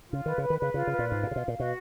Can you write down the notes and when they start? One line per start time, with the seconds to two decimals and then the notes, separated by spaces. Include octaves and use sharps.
0.09 C#3 F4
0.25 D#3 B4
0.38 C#3 B4
0.50 D#3
0.58 C#3 B4
0.74 C#3 F4
0.87 C#3 B4
0.99 A#2
1.07 G#2 F4
1.23 A#2 F5
1.31 C#3
1.36 B2 F5
1.48 A#2
1.57 B2 F#4